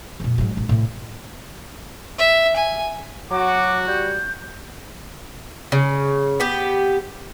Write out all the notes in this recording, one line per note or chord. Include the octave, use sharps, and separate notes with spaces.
F2 A#2
G#2 F#3
A1
A2 C3
E5
G#5
F#3 F#4 D6
G3 G6
C#3
B3 G4